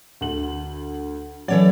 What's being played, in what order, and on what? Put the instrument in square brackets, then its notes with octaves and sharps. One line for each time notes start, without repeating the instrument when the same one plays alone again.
[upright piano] D2 F#7
[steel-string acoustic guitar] E3 C#5 D5 [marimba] F#3 [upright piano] C#4 A4